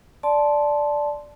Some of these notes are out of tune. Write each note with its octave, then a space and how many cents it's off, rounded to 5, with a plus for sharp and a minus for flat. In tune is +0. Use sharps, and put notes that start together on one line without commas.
D5 +0 A5 -15 C6 +0